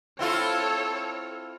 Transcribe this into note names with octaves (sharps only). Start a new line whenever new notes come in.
C4 E4 F4 A4 C#5